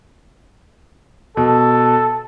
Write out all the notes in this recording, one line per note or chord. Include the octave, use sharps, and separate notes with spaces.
B2 A4